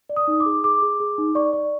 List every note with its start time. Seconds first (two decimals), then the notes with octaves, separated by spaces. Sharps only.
0.09 D5
0.16 D#6
0.28 D#4
0.40 D6
0.46 G#4
0.64 G#4 D6
0.82 G#4
1.00 G#4
1.18 D#4
1.35 D5 C#6
1.53 D5